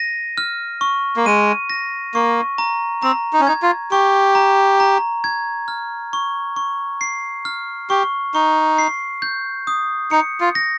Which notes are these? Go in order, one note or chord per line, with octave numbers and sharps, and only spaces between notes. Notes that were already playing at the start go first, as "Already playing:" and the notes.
Already playing: A#6 D#7
F6
C#6
A#3
G#3 D#7
A#6
A#3 C#6
A#5
C4 A#5
D#4
C#4
D#4 G#6
F4
G4 C#6
A#5
A#5
G#6
F6
C#6
C#6
C7
F6
G4 C#6
D#4 C#6
C7
G6
D#6
D#4 C#7
F4
A#6